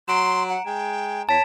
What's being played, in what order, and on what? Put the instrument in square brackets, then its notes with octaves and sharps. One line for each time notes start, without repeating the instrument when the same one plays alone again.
[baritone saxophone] F#3 [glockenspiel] A#5 D7 E7 [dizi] C6
[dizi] F#5
[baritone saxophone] G#3 [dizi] G5
[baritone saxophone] E2 [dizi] C#5 [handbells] A5 [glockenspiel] B6 D7